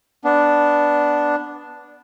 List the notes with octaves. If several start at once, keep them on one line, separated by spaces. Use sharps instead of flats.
B3 D4